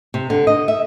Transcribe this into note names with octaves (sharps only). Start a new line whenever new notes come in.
C3
D3
D#5
E5